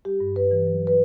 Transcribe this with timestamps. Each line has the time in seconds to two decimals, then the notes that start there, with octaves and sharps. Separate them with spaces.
0.05 G3 G4
0.20 G2
0.36 G2 B4
0.51 E3
0.67 F#3
0.87 B4